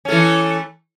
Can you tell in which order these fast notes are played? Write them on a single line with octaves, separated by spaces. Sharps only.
C#4 A3 E3